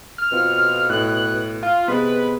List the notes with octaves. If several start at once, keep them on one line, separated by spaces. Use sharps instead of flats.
F6
B2 C4 F4
A2 F#6
F4
C3 G#3 B3 B4